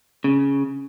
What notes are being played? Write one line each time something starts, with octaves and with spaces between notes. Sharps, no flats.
C#3